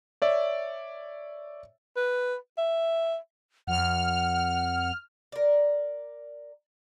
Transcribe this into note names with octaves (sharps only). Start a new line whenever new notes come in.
C#5 D5 E5
B4
E5
F2 F#5 F6
A#4 D5